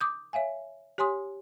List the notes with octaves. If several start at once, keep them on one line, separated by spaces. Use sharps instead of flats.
D6 D#6 G6
C#5 E5 F5 G#5
G4 C#5 G#5 C6 D#6